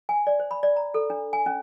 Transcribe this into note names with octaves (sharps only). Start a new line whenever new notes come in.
G#5
D5
C5
B5
D5
A#5
A4
D4
G#5
C#4